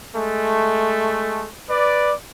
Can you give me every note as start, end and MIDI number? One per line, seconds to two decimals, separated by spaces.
0.15 1.48 56
0.15 1.48 57
1.68 2.13 71
1.68 2.13 74